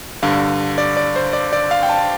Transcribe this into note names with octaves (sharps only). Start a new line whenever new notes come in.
G2 D3 F5
D5
D5
C5
D5
D5
F5
G5
A5